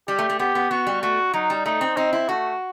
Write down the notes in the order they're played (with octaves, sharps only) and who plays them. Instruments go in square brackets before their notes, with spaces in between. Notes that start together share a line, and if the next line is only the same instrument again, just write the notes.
[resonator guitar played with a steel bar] G3 [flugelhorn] G4
[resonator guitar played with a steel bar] A3
A3
[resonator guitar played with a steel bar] B3 [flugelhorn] G4
[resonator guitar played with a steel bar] B3
[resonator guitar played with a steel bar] B3 [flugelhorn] F#4
[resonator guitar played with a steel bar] G3
[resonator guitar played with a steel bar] A3 [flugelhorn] F#4
[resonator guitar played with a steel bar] F#3 [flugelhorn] D#4
[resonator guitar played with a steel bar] G3
[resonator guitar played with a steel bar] A3 [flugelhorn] D#4
[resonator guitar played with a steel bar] C4
[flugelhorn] C4 [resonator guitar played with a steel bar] D#4
[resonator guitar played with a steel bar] E4
[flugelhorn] A3 [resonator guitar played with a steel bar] F#4